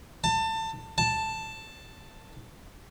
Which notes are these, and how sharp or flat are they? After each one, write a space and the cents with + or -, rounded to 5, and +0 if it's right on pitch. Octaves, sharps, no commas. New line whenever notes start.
A5 +25
A5 +5